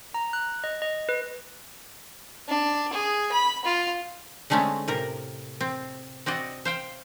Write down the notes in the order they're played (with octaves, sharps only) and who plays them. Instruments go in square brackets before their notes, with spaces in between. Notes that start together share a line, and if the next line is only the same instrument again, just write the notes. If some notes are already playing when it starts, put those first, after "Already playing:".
[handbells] A#5
F#6
D#5
D#5
B4
[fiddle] D4
G#4
B5
F4
[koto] D3 G#3 A3 C4 C#4
A2 C3 A#4 A#5
C4
C4 F#4 D5 D#5
C5 F5 G5